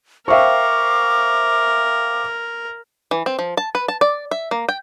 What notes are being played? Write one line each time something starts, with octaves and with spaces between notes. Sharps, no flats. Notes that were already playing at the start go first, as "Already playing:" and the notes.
A#4 C5 E5 F5 G5 C#6 D6
E3
C4
F3
A5
B4
A5
D5
E5
A#3
G5